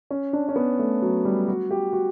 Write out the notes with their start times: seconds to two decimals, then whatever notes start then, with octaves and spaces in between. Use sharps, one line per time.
0.11 C#4
0.33 D4
0.49 C#4
0.56 B3
0.79 A3
1.02 F#3
1.25 G3
1.48 F#4
1.71 G4
1.93 F#4